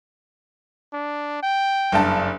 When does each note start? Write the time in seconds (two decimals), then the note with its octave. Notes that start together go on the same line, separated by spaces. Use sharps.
0.93 D4
1.43 G5
1.92 F#1 G2 A5